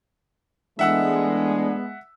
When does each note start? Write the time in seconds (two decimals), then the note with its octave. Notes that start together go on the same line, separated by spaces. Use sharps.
0.79 E3 G#3 A3 B3 D4 E5 F#5 E6